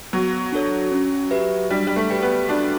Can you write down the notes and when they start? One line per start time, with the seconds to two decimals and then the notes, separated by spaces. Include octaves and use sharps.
0.13 F#3 B3
0.52 D4 A4 C#5
0.92 C#4
1.31 G4 B4 E5
1.70 G3 D4
1.87 G3
1.96 A3
2.10 G4 B4 D5 G5
2.22 B3
2.49 D4 F#4